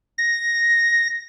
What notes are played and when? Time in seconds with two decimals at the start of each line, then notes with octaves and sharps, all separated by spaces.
0.18 A#6